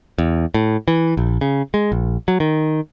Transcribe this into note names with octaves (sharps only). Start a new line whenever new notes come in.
E2
A2
E3
A#1
C#3
G#3
A#1
F#3
D#3